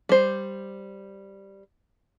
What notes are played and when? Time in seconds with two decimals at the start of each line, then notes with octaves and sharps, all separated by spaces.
0.09 G3 C5